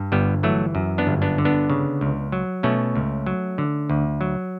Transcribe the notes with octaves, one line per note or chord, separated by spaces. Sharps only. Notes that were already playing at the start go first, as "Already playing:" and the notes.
Already playing: G2
G1 G3 B3
E3 F#3 A3
F#2
B3 D4
G1
B3 D4
D3
B3 D4
C#3
C#2
F#3
B2 A3 C#4
C#2
F#3
D3
D2
F#3